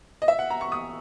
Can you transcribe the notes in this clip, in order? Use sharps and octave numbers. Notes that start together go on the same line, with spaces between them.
D#5
E5
F#5
A#5
C#6
D#6